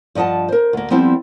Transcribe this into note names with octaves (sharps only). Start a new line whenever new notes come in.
G2 F3 D#5 F#5 A5
A#4 C5
D2 A#3
F3 G3 B3 C4 E4